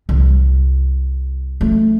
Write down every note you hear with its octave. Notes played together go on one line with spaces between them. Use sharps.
C2
A3